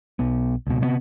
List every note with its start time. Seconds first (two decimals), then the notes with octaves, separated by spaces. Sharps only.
0.19 B1 B3
0.67 C#2 B2
0.80 C3 G3 B3